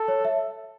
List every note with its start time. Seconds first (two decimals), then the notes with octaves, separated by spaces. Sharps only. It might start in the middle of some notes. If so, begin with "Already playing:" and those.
Already playing: A4
0.08 C#5
0.25 E5